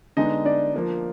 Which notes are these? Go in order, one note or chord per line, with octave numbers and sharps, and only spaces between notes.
D3 G#3 B3 D4 D#4 D#5
D4 D5
F3 A#3 D4